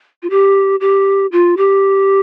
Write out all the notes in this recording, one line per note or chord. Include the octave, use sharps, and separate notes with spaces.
F4
G4
G4
F4
G4